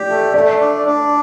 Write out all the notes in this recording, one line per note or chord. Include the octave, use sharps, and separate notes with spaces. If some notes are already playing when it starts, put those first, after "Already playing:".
Already playing: G4 D5
A3
A3 D5
D4
D4